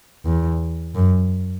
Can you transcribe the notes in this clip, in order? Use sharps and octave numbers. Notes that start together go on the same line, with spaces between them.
E2
F#2